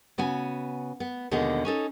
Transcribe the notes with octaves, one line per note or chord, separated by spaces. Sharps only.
C#3 B3 F#4 G#5
B3
D#2 B2 D3 G#3 B3 D#5
C#4 D#4 A4